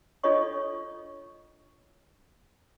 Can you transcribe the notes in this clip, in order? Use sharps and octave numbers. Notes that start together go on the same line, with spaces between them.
D4 F4 A4 C#5 D#5 C#6